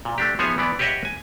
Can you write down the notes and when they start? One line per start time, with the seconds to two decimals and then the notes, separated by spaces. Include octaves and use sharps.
0.05 A#2
0.18 A3 D4 G4
0.39 F3 B3 D#4 G#4 C#5 E5
0.58 E3 B3 D5
0.79 G4 B4 C#5 D#5 E5 F#5
1.05 G#5